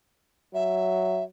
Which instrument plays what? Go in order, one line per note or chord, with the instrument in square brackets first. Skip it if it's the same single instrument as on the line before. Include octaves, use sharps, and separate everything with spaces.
[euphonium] F#3 [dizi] E5